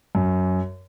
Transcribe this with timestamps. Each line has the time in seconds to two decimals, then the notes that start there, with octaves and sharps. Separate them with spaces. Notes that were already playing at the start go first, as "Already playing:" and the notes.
0.15 F#2